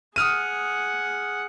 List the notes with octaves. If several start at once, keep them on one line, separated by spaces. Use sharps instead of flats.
G#4 F#5 D#6 F6 D#7